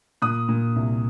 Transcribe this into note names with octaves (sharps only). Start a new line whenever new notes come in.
A#2 D#6 F#6
A#2
C2